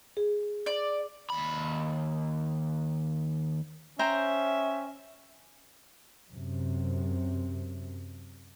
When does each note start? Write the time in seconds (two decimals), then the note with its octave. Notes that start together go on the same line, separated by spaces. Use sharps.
0.17 G#4
0.66 D5
1.30 D#2 B5
3.99 C#4 C5 E5 G5 A#5
6.31 F#2 C3